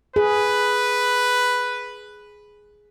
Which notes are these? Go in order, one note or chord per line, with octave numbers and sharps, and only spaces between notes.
G#4 B4